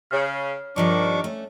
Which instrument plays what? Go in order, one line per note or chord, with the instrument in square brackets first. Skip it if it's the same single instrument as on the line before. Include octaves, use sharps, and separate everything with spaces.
[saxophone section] C#3 [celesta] C#5 F6
[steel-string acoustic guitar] G2 F3 G3 [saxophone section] D#3 [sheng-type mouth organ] D4 C#6 D6
[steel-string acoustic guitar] A3 C#4